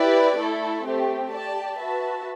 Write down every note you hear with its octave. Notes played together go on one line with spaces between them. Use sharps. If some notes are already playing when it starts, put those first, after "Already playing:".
Already playing: E4 G4 B4 D5
A3 E4 A4
A3 C4 G4
G4 D5 A5
F#4 B4 E5 A5